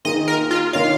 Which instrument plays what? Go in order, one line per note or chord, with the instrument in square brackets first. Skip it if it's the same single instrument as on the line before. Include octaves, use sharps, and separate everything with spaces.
[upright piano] D#3 A#3 F4 G#4 [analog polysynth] D#5
[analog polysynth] A#4
F4
[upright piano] D#3 A#3 F4 C#5 [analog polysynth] F5